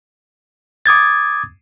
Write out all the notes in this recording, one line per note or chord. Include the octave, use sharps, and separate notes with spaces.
D6 D#6 G#6 A6